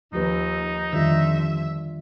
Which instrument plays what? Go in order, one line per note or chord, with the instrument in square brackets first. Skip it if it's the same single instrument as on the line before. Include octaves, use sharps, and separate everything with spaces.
[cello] D#2 [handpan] F3 G4 B4 [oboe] D#4
[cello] F2 E5 [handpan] D3 G3 F4 [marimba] D#3